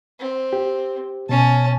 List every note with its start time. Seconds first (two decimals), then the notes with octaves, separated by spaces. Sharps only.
0.19 C4
0.53 G4
1.29 B2 C#4 A5